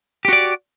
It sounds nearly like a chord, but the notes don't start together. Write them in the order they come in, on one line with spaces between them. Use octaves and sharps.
G4 F#4 D5